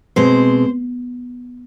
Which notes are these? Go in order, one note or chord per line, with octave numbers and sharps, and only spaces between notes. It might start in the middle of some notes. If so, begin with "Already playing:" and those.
B2 G#3 C4 C5